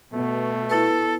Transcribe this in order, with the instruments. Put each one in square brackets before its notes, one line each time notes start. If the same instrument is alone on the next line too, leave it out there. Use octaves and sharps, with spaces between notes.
[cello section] B2 [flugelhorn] A3
[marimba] E4 B4 [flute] A4